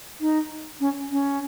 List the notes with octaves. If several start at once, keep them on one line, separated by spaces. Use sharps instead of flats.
D#4
C#4
C#4